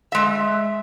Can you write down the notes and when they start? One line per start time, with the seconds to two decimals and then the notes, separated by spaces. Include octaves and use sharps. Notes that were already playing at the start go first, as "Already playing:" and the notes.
0.12 G#3 E5